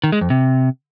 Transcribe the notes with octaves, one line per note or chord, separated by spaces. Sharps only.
D#3
G#3
F2
C3